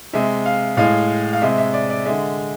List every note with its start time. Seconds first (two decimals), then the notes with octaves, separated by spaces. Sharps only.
0.13 C3 G#3 E5
0.46 F5
0.77 A2 G#3 F5
1.33 F5
1.42 C3 G#3 E5
1.58 E5
1.74 D5
1.90 D5
2.06 D3 G#3 E5